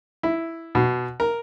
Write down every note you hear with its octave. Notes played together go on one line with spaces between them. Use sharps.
E4
B2
A#4